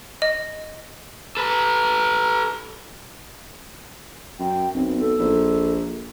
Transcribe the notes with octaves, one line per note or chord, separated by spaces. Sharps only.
D#5
A4 B4
F#2 G5
B1 C4
A4
A#1